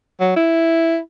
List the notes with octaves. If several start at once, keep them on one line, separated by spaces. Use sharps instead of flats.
F#3
E4